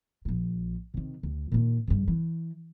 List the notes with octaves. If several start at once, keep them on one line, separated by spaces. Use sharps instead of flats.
A#1 A#2
C3 D#3
D2
A#2 D#3
G2 C#3
E3